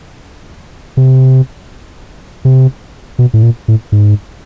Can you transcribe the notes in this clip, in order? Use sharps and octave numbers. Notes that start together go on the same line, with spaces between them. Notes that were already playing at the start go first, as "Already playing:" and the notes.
C3
C3
B2
A2
A#2
A2
G#2